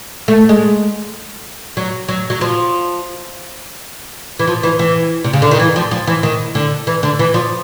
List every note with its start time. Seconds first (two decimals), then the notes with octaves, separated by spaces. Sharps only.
0.28 A3
0.49 G#3
1.77 F#3
2.09 F#3
2.30 F#3
2.41 F3
4.39 E3
4.47 F3
4.63 E3
4.79 E3
5.24 C3
5.33 C#3
5.42 D3
5.51 D#3
5.60 E3
5.76 F3
5.91 F3
6.07 E3
6.23 D#3
6.55 D3
6.87 E3
7.03 D3
7.19 E3
7.34 F3